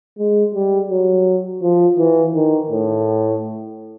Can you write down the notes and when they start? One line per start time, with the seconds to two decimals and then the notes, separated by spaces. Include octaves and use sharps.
0.18 G#3
0.54 G3
0.90 F#3
1.62 F3
1.98 E3
2.34 D#3
2.70 A2